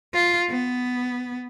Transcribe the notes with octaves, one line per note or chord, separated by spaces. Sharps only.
F4
B3